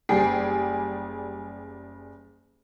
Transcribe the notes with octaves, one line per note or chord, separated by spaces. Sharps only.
F#1 G3 G#4 G5 C7